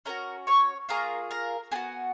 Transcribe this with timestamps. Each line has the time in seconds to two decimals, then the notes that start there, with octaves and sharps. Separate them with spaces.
0.05 C#4 F#4 A#4 A#5
0.47 C#5 C#6
0.89 A#3 F4 G#4 A#4 A#5
1.31 A#4 A#5
1.72 B3 F#4 G#4 G#5